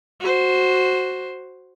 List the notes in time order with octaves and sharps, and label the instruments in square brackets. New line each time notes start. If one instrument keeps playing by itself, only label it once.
[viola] F#4 C5